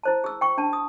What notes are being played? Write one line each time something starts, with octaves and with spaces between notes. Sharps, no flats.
E4 C5 A5
G#4 E6
G5 C#6
D4 A5
D#6